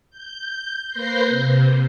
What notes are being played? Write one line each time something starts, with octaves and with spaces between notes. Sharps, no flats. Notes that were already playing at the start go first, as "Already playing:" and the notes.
G6
A#3 B4 C5 G6 A#6 C7
C3